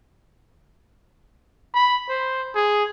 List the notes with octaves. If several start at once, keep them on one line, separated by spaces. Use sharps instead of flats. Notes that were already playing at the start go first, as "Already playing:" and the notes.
B5
C5
G#4